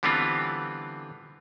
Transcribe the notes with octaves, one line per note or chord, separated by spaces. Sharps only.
D3 E3 G3 B3 C4 F4